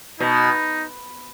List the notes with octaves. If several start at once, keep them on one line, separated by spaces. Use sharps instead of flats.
B2 D#4